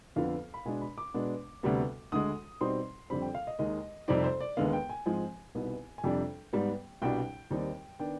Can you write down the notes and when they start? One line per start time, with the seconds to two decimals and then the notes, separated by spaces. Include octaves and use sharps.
0.16 F2 D3 F3 B3 F5
0.54 B5
0.65 B2 G#3 D4 G#5
0.81 B5
0.98 D6
1.14 B2 G#3 B3 D4
1.63 D2 C3 G3 B3
2.12 D2 D3 G#3 D#6
2.61 B2 G3 C4 D#4 C6
3.10 F2 D3 G3 C4 B5
3.22 G5
3.35 F5
3.47 D#5
3.59 D#2 D#3 G#3 D#5
4.08 F2 C3 G3 C4 D#4 D5
4.24 C5
4.41 D5
4.57 D#2 D3 G#3 B3 F5
4.68 F5
4.73 G5
4.89 G#5
5.06 G#2 F3 G#3 C4 G#5
5.55 C2 B2 B3 D#4
5.98 G#5
6.04 F2 C3 G3 D4 G5
6.53 G#2 G3 B3
7.02 C2 B2 G3 D4 G5
7.51 D#2 D#3 G3 C4 D#4
7.99 D#3 B3 D4 G5